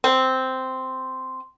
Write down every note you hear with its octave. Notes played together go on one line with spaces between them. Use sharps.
C4